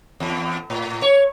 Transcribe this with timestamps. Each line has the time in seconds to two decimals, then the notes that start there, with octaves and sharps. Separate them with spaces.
0.20 E2
0.70 A2
1.02 C#5